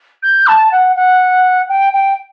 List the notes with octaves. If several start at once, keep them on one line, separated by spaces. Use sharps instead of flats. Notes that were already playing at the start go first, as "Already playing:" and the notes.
G6
A5
F#5
F#5
G5
G5